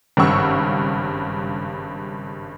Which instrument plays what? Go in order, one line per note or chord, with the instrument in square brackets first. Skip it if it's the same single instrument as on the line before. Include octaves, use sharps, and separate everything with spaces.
[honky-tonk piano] G#1 G2 C#3 F#5 C#6 E6